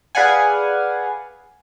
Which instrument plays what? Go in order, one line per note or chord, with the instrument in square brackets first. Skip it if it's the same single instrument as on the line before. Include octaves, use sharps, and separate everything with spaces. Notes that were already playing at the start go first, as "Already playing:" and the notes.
[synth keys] G#4 B4 D5 F5 F#5 G#5